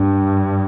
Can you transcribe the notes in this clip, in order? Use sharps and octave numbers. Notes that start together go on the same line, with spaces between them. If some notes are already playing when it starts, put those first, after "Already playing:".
Already playing: G2 D4